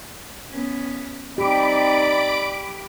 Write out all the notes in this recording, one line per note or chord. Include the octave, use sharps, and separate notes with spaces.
B3 C#4
C4 D#4 G4 D5 B5 D6 D7